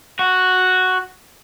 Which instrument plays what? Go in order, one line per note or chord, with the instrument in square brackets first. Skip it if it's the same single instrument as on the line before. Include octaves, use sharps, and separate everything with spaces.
[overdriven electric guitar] F#4